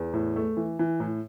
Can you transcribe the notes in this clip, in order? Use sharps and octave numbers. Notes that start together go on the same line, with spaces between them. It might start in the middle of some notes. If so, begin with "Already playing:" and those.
Already playing: E2
A2
A3
E3
E3
A2